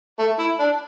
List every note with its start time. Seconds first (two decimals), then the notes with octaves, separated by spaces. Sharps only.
0.19 A3
0.39 E4
0.59 D4